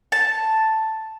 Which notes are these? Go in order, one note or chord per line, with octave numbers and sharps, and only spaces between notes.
A5